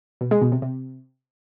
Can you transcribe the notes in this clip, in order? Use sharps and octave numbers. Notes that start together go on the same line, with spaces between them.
B2
G#3
B2
C3
C3